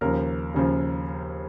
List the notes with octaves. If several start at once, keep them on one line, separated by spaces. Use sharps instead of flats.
D#2 C#3 F3 A#4
D#2 C#3 F3